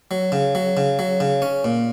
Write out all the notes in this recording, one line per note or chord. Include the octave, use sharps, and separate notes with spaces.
F#3
C#3
F#3
C#3
F#3
C#3
C#4
A#2